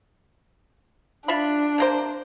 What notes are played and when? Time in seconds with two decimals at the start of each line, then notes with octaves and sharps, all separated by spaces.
1.28 D4 F4 E5 B5
1.78 C3 A#3 C5